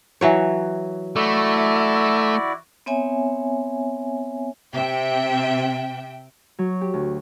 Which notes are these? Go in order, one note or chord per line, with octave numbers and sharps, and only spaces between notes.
E3 F#3 C#5
A3 E4 F#4 D5
B3 C4 C#5 E5 G#5
C3 E5 G5
F#3
G4
D2